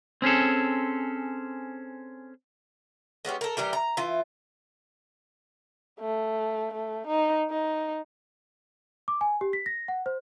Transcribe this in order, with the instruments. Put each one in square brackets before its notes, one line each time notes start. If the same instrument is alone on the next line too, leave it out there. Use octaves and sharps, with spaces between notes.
[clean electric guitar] C4 C#4 G#4 A4
[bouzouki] G#3 B3 C#4 G4
A4 A#4
E3 G3 G4 A#4
A#5
E3 F4
[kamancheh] A3
A3
D#4
D#4
[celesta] D6
G#5
G4
B6
A#6
F#5
C5